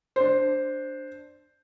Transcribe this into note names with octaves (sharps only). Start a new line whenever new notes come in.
D4 C5